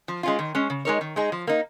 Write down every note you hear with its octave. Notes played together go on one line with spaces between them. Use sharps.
F3
G#3 C#4 F4
D#3
G#3 C#4
C#3
G#3 D#4 A#4 C#5
D#3
G#3 D#4 G#4
F3
A#3 D#4